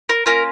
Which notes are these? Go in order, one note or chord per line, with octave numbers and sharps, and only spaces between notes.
A#4
A#3 C#4 F4 A#4